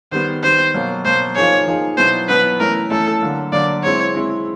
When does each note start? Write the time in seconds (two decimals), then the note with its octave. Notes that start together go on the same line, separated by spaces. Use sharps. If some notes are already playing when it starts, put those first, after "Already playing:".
0.12 D#3 G3 B3 C5
0.43 D#3 G3 B3 C5
0.74 B2 F#3 A#3
1.05 B2 F#3 A#3 C5
1.36 F3 A#3 D#4 G#4 C#5
1.67 F3 A#3 D#4 G#4
1.97 B2 F#3 B3 E4 C5
2.29 B2 F#3 B3 E4 B4
2.60 E3 A3 C#4 A#4
2.90 E3 A3 C#4 A4
3.21 D3 F#3 A#3
3.52 D3 F#3 A#3 D5
3.83 G#3 C4 E4 C#5
4.14 G#3 C4 E4